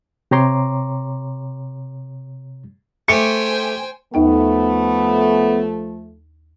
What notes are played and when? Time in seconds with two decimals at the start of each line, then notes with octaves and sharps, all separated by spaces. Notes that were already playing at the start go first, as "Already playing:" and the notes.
0.31 C3 G4 C#5 A#5 C6 D6
3.08 A3 G4 C5 G5 G#5 C#7
4.14 D#2 F3 A3 B3 D#4 G5